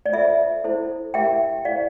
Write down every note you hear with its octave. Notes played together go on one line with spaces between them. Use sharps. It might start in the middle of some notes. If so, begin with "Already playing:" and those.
D5
F4 A4 C5 E5
E4 A4 C5
E4 G4 A#4 E5 G5
E4 A4 C5 D5 F5